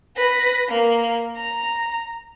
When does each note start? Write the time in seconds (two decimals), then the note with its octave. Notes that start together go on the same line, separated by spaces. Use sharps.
0.17 B4 A#6
0.69 A#3
1.37 A#5